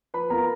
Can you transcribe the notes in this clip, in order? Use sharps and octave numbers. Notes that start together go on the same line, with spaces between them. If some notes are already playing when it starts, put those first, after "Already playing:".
F3 B4 B5
B3 F4 A#4 A#5